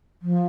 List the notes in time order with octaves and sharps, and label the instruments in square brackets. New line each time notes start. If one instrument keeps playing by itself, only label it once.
[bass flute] F3